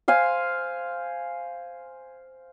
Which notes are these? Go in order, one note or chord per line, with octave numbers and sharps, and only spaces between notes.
C5 F5 G#5